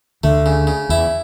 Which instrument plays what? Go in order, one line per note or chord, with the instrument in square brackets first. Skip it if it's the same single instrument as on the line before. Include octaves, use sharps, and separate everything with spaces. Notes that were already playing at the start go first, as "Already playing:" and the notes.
[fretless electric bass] D2 D3 [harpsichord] A3
[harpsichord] C#3
C#3
[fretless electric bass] E2 E3 [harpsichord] E4